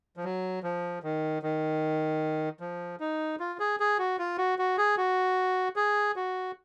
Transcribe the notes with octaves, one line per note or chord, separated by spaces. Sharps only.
F3
F#3
F3
D#3
D#3
F3
D#4
F4
G#4
G#4
F#4
F4
F#4
F#4
G#4
F#4
G#4
F#4